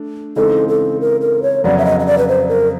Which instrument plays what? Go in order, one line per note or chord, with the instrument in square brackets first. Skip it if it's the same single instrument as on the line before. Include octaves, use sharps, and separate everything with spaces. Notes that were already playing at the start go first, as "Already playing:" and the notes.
Already playing: [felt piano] A3 D4
[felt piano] C#3 E3 G#3 C4 D#4 [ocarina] A4
[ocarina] A4
A#4
A#4
C#5
[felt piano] F2 C#3 F#3 B3 [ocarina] D5
[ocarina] E5
D#5
D#5
D5
B4
C5
A#4